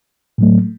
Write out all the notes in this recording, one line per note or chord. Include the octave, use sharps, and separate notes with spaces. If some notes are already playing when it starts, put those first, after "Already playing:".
A2 F#3 A3